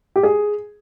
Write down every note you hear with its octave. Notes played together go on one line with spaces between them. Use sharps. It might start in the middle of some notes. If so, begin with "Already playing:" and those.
G4
G#4